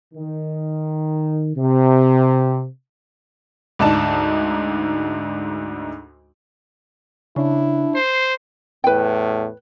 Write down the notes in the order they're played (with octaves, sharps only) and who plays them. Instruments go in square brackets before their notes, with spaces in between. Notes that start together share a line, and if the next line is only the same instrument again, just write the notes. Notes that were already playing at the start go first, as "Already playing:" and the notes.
[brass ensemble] D#3
C3
[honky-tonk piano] D2 G#2 D4 D#4 A5
[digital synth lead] C#3 [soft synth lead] D4 [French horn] E4
[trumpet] C5 [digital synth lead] C7
[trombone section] E2 A2 [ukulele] B4 G5